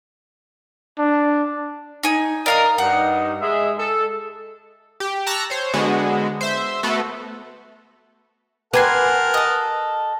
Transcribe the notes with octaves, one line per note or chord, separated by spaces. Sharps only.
D4
D#4 G#5
A#4 D5 D#5 F5 D#6
G2 D#4 F#5
G#3 E5
A4
G4
A5 A#5 C#6 E6 F#6 A#6
C5 C#5
D3 G#3 B3 F#4
C5 E5
A3 B3 F#4 A4
G4 A#4 B4 F#5 G#5 A5 C6
A4 D#5